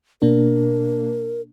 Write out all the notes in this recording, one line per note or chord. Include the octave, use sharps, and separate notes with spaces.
B2 A#3 D4 A#4